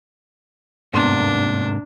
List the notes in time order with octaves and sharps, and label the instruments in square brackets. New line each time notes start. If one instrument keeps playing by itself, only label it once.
[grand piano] G1 E2 C6 [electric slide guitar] G#2 C3 A#3 [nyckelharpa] D4